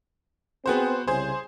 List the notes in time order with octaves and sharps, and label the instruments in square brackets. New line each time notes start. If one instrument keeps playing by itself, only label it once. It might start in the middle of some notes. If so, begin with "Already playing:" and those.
[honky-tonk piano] B3 F#4 C5 [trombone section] C4 G#4
[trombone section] C2 C#3 [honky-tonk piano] G#4 C5